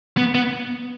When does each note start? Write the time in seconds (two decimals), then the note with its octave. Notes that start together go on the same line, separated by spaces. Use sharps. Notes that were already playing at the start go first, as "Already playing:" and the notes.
0.18 B3
0.35 B3